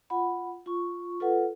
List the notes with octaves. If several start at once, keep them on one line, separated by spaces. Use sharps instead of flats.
F4 F#5 B5
F4 C#6
F4 A4 B4 F#5